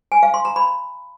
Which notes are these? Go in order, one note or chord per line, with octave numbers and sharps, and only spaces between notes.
G#5
F5
C6
A#5
B5